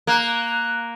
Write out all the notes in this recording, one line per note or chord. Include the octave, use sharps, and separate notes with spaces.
A#3 F#6